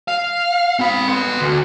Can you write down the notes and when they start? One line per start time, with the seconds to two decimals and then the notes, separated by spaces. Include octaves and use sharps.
0.08 F5
0.79 C4 B5
1.08 B3 C6
1.41 D2